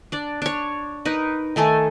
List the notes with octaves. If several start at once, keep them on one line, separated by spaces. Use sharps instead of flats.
D4 D5
D4 C#5
D#4 A#4 B4
D#3 A3 A4 G#5